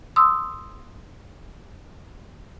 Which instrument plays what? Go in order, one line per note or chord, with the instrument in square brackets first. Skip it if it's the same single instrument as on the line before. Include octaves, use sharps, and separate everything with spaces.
[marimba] C6 D#6 E6